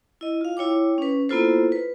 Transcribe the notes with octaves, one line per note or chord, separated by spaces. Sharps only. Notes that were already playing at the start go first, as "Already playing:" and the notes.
E4 D#5
F4 F5
E4 C#5 G5 D6
C#4 B4
A#3 B3 E4 F4 A4 C5
B4